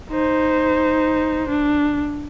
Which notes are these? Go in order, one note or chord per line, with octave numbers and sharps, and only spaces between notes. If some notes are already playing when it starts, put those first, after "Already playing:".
D#4 C5
D4